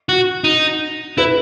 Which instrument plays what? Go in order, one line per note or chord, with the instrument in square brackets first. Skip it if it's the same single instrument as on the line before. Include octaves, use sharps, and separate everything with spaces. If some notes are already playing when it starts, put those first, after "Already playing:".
[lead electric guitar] F#4
D#4
[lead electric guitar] E4 [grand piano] B4